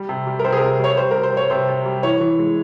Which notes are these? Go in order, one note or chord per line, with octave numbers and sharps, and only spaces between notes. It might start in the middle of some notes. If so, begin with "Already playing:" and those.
Already playing: G3
C3
G3
A#4
C3 C5
G#4
C3 A#4
G3 C#5
G3 C5
C3 A#4
C5
G3 C#5
C3 C5
C3
G3
E3 C#5
E3
G#3